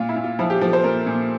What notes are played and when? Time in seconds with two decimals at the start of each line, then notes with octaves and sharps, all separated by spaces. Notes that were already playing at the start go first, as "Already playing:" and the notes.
Already playing: A#2 F4
0.09 E4
0.16 A#2
0.24 F4
0.39 F3 E4
0.50 G4
0.61 F3 A4
0.73 C5
0.84 A#2 A#4
1.06 A#2